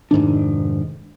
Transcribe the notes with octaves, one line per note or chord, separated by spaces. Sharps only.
F1 G#2 D#3 D4